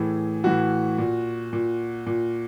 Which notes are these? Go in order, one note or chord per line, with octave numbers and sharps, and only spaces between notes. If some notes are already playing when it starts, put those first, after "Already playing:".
Already playing: A2 E3 G#4
A2 E3 F#4
A#2
A#2
A#2